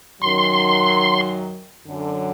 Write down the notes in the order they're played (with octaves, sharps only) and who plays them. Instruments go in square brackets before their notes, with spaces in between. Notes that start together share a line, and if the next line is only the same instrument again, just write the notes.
[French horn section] F#2 D#3 F#3 [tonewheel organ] C6
[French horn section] F#2 D3 F#3